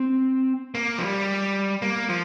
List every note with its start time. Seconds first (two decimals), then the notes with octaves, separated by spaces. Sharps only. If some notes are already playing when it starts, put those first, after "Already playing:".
Already playing: C4
0.75 A#3
0.98 F3
1.01 G3
1.82 A#3
2.09 F3